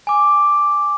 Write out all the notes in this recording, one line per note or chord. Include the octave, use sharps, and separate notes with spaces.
G#5 D6